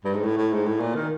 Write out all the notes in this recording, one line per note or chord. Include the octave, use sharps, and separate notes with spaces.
G2
G#2
A2
A2
G#2
A2
A#2
D#3